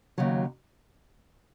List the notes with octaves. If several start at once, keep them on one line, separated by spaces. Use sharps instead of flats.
D#2 C#3 F#3